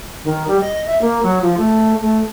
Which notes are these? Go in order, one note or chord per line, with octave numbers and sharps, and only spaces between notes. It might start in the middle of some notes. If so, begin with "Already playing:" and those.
D#3
G3
D#5
E5
A#3
F#3
F3
A3
A3